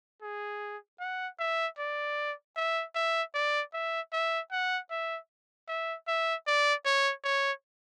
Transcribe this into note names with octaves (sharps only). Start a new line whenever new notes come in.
G#4
F#5
E5
D5
E5
E5
D5
E5
E5
F#5
E5
E5
E5
D5
C#5
C#5